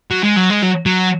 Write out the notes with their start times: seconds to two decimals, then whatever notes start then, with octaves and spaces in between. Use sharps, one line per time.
0.11 F#3
0.24 G#3
0.37 F#3
0.51 G#3
0.63 F#3
0.86 F#3